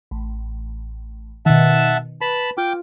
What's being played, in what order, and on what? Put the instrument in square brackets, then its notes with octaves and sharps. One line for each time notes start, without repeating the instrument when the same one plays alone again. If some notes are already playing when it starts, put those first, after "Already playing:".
[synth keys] A1
[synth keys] B2 D#3 [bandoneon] E5 F#5 A5
[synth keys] B4 [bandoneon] A5 B5
[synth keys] F4 [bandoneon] G5 D6